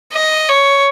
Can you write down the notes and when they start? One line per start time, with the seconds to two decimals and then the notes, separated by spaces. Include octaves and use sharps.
0.13 D#5
0.49 C#5